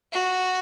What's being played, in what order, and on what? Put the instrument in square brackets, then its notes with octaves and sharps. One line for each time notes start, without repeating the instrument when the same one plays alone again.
[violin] F#4